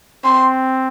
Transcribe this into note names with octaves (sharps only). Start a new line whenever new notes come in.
C4 C6